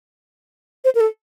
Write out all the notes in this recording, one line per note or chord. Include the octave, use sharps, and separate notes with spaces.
C5
A#4
A4